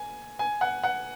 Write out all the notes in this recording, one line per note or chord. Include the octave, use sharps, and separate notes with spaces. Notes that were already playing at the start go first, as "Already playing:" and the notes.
Already playing: G#5
G#5
F#5
F#5